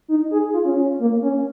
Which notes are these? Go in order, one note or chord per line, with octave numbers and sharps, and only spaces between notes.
D#4
G#4
F4
C#4
C#4
A#3
C#4